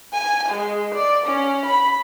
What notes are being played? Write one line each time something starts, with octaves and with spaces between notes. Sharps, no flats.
G#5
G#3
D5
C#4
B5